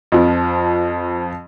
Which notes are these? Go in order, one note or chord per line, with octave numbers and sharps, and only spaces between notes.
F2 F3